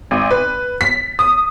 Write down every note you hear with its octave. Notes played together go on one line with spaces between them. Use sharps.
G#1
B4
B6
D#6